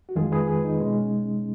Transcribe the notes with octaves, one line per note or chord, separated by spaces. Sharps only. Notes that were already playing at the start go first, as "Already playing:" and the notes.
F#4
F2 D#3 G#3 F4 G#4
G#4 B4
G#4 B4
D#4
B2 G#3 C#4